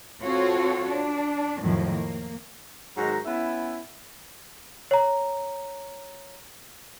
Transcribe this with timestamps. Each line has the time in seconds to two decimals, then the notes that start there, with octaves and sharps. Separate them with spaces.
0.22 C4 F4 F#4 A4 C#5
0.88 D4
1.61 F2 A2 D#3 F3 F#3
1.91 A#3
2.96 G#2 D#3 F#3 F#4 A#5
3.25 B3 C#4 E4
4.91 C#5 A#5